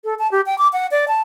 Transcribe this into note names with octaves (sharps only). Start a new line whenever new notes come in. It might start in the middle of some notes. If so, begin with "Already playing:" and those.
A4
A5
G4
G5
D6
F#5
D5
A5